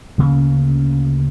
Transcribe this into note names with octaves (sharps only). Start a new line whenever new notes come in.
D2 C#3 A#3 C#4